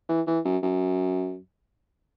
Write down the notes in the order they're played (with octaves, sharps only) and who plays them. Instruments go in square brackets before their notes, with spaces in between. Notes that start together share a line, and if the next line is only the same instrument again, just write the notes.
[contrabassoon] E3
E3
F#2
F#2